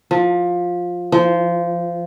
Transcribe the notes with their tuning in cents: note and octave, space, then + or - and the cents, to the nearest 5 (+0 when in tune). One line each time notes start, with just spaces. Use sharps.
F3 +15
F3 -20